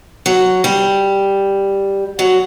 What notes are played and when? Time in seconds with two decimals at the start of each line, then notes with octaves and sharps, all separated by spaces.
0.26 F#3
0.64 G3
2.19 F#3